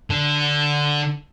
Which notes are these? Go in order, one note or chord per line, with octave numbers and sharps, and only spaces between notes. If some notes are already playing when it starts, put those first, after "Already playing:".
D3